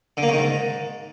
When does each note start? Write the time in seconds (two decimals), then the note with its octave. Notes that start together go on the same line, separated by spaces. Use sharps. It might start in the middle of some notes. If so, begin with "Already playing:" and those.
0.17 D3
0.23 A#3
0.28 C#3
0.33 D#3
0.38 G#2